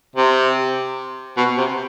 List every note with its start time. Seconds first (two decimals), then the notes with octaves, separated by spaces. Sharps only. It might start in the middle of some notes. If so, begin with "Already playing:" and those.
0.16 C3
1.37 B2
1.58 C3